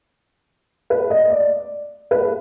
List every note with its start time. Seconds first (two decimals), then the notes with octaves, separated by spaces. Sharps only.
0.90 B4
1.10 D#5
1.30 D5
2.11 B4